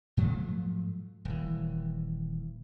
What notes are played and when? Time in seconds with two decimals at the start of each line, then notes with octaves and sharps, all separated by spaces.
0.17 G#2 F3 F#3 A3
1.25 D#1 E3